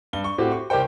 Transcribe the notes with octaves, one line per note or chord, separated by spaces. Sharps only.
G2 G7
C#6
A2 C4 F#4 G4
C#6
C2 G4 A#4 C5 G5